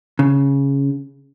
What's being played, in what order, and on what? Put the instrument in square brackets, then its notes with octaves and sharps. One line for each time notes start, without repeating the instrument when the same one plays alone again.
[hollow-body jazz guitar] C#3